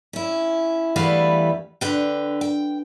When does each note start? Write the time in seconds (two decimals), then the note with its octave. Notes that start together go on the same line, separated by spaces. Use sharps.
0.13 C#4 E4
0.96 E2 E3 G3 A3 B4 F5
1.81 D3 B4 G5
2.41 G5